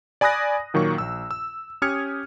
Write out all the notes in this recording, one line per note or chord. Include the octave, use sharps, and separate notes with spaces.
D5 G#5 B5 D#6 F#6 A#6
A#2 D#3 F#3 A#3 C#6
A#1 E6
E6
C#4 G4 D#6 F6 G#6 C#7